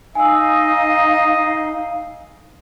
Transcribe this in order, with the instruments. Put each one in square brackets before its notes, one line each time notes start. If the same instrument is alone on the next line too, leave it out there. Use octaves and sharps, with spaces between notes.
[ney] D#4 [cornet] D#5 [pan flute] F5 [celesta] G#5 E6